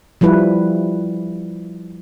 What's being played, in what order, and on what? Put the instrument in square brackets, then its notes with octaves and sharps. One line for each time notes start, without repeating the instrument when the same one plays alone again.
[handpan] F3 G3 E4 B4